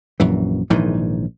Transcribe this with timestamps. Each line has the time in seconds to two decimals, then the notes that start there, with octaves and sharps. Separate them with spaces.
0.20 A#1 F#2 E3
0.70 A#1 G#2 D#3 E3